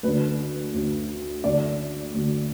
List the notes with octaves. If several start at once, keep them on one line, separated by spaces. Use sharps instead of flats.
D2 D3 B4
D2 D3
D2 D3 D5
D2 D3